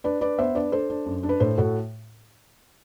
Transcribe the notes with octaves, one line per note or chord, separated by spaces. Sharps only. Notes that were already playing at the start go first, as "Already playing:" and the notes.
D4 B4 D5
D4 B4 D5
B3 C5 E5
D4 B4 D5
D4 A4 C5
D4
F#2
D4
B4
A2 A4 C5
A2 F#4 A4